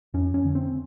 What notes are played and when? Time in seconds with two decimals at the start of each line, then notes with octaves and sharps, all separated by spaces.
0.14 F2 C#4
0.34 C#4
0.45 D3
0.55 C4